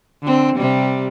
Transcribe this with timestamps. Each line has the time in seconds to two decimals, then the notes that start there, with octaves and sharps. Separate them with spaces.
0.22 D3 C4
0.56 C3 G3